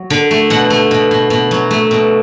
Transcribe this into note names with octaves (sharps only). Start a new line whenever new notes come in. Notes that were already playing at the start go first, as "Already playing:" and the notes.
Already playing: F#3
D3
A3
B2 F#5
A3
B2
B2
B2
F#3
A3
B2